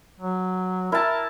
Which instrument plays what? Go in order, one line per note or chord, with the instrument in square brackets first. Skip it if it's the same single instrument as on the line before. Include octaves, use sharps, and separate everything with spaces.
[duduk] F#3
[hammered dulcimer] E4 A5 [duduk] A#4